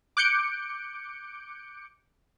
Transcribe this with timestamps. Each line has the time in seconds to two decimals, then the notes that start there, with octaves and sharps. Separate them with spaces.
0.17 D6 F#6 G6 C#7 D7